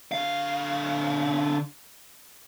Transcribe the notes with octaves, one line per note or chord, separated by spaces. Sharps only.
D3 F5